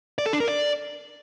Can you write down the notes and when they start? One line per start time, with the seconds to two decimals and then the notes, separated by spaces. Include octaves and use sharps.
0.18 D5
0.26 A4
0.33 D4
0.40 A#4
0.48 D5